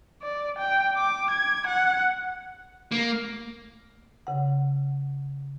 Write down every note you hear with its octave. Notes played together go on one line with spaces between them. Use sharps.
D5
G5
D6
G#6
F#5
A#3
C#3 F#5